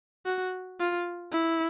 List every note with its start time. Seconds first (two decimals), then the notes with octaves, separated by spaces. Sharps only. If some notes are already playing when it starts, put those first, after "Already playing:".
0.26 F#4
0.80 F4
1.32 E4